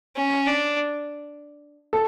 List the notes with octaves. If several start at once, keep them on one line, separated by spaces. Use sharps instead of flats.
C#4
D4
A4